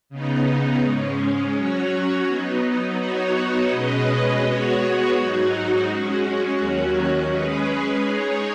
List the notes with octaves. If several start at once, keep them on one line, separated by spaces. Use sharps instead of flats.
C#3 B3 D#4
G#2 G#3 C#4
F#3 C#4 F#4 C#5
F#3 B3 D#4
F#3 B3 D#4 F#4 C#5
B2 G#3 C#4 B4 D#5
G#3 B3 F#4 C#5
G#2 F#3 D#4 F#4
G#3 C#4 F#4
D#2 D#3 F#3 C#4 F#4
G#3 C#4 G#4 B4
G#3 D#4 G#4 C#5